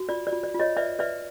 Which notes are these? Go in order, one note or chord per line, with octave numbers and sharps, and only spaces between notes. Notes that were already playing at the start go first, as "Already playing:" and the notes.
Already playing: F#4
F4 D5
D5
F4
D5
F4
C#5 D#5
B4 D5 E5
B4 D5 E5